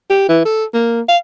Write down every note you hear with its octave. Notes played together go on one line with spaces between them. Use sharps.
G4
E3
A4
A#3
F5